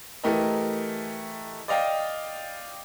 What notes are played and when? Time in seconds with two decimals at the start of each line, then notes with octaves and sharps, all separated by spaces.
0.24 E3 A3 G4 A#4 D#5
1.68 D5 D#5 F5 G5